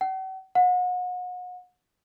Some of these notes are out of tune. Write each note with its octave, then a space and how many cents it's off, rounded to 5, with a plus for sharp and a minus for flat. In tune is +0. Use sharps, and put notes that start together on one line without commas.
F#5 +45
F#5 -35